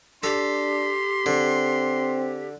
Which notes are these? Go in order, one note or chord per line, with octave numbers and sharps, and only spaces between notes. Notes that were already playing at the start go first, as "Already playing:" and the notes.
D4 G4 A4 C6
D3 C4